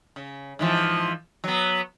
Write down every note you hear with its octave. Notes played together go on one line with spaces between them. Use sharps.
C#3
G#2 E3 F3
F#3 B3